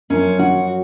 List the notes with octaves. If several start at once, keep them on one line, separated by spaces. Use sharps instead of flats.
F#2 F3 C#4
F#4